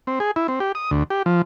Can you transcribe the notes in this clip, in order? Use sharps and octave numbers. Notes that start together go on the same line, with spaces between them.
C4
G#4
E4
C4
G4
D#6
D2
G4
F3